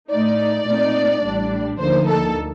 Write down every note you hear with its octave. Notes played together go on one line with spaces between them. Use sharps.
A2 A3 D#4 D5
A#2 A3 C4 D#4
A1 A2 G3 D4
D2 D3 F3 A#3 D#4 C5
A4